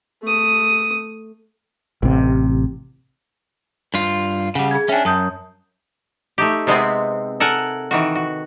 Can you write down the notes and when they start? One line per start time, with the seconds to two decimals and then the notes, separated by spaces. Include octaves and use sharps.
0.22 A3 D#6
2.02 A1 C3
3.94 G2 F4
4.55 C#3 G3 F#5
4.71 G#4 G#6
4.89 C#4 D4 E5 G5 G#5
5.05 F#2 A5 D#6 G6
6.38 A3 D#4 G4
6.67 C3 G#3 B3 C4
7.40 A4 A#4 F#5 G#5
7.91 D#3 E3 F#4
8.15 F#4